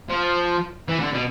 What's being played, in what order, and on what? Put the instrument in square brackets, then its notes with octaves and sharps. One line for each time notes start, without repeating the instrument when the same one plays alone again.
[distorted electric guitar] F3
E3
D3
B2